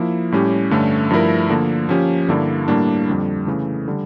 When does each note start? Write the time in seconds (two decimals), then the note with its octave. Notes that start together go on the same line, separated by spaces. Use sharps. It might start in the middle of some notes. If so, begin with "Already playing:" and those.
Already playing: F3 A#3 E4
0.32 A2 G3 C#4 G4
0.71 G2 D3 A3 C#4
1.10 G2 F3 A3 E4 A#4
1.50 D3 F3 A#3
1.89 F3 A#3 C#4 G4
2.28 G2 D3 G3 A#3 E4
2.68 A2 G3 A#3 D4
3.07 F2 D3 G3
3.47 C#3 E3 A3
3.88 D3 G3